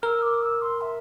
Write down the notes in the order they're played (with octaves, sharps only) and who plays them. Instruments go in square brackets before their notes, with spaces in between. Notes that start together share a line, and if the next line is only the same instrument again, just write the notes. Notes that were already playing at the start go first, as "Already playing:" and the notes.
[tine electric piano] A#4 [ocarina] E6 F6
[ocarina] D6
E6
C6
E5